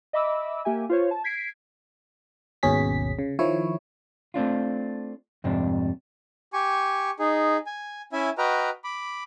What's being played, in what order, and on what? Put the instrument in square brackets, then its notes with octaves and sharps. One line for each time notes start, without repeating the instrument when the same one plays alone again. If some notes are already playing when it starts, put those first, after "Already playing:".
[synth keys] D#5 E5 B5 D6 E6
A#3 G4 E5 G#5
F4 C5 C#5
A5
G#6 B6 C7 D7
[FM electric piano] G#1 D#2 B2 C#4 G#4 B6
C#3
D#3 F3 E4 C#5
[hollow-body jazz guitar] A3 C4 D4 F4
F2 G#2 C3 D4
[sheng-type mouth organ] G4 G#5 C#6
D#4 G#4
G#5
C#4 E4 E5 G#5
F#4 B4 D#5 G5 A#5 F6
B5 D6